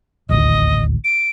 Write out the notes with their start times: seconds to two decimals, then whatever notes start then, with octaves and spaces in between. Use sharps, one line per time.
0.29 D#1 A1 D2 D#5
1.04 D7